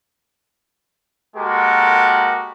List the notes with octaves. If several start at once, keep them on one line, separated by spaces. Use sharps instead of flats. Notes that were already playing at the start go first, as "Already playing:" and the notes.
G#3 A#3 F#4 G4 A4 A#4